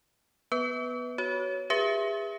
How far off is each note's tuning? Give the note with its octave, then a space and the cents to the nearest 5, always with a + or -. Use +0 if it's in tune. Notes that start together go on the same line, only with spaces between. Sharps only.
B3 +0 B4 +0
F#4 +15 C#5 +0
G#4 -40 B4 -25 E5 +10